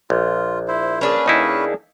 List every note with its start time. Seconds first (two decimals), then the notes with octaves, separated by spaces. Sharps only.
0.10 A#1 F4
0.68 E4 C5
1.01 A#3 C#4 D4 G#4 B4
1.26 D#2 D#4 E4